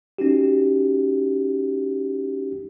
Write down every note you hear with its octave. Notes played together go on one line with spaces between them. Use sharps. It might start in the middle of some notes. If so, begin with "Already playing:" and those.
C#4 D#4 F#4 G4